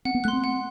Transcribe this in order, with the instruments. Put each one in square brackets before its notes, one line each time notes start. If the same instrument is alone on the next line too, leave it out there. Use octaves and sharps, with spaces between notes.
[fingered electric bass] C4 [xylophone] F#5
[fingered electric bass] B3
[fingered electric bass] A3 [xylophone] F#6
[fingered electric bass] C4 [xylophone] C6
[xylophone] F#5